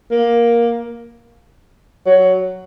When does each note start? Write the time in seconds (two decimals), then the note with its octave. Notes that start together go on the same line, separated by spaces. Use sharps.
0.12 A#3
2.07 F#3